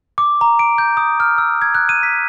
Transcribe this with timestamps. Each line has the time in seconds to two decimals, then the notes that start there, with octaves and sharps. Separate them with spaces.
0.18 D6
0.41 A#5
0.59 D7
0.78 G6
0.97 D#6
1.20 F6
1.38 E6
1.62 G#6
1.75 F#6
1.89 D#7
2.03 B6